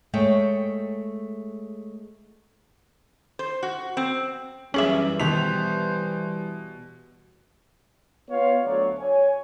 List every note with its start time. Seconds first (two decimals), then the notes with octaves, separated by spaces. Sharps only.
0.13 G#3 A3 C#5 G5
3.39 C5
3.63 F#4
3.97 C4
4.74 F#2 E3 G3 C#4 G#4 E5 D6 F#7
5.20 B2 D#3 C5 B6 F7
8.30 B3 F4 C#5 F5
8.64 D2 F#3 C#5 D5
8.99 C#5 G#5